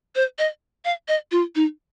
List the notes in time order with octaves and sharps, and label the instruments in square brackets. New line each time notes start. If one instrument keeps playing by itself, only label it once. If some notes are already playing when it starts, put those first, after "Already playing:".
[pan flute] C5
D#5
F5
D#5
F4
D#4